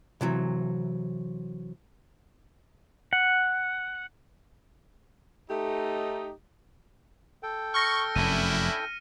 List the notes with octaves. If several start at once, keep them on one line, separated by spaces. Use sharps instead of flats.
C3 E3 F#3
F#5
A3 D#4 G4
A4 G5
C#6 F6 A#6 C#7
F1 F#2 C#4 D4 E4 A#6 D#7